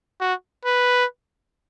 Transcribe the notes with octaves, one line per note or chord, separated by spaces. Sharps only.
F#4
B4